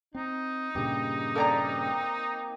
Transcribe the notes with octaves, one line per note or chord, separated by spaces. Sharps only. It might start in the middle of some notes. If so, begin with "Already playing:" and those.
C4 D#4
G2 A#2 C#3 G4
A#3 C4 G4 A4 D5 A#5